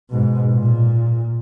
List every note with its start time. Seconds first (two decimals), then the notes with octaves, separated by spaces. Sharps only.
0.11 G#2 B2
0.52 A#2